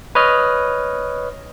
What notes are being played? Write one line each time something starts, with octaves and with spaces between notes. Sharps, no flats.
B4 C#5 D#5 F6